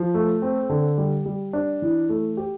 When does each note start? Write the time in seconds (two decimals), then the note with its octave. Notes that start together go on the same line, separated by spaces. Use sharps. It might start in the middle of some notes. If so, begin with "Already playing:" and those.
Already playing: F3
0.14 A3
0.42 C4
0.69 D3
0.98 G3
1.26 G3
1.53 D4
1.82 E3
2.09 A3
2.37 G4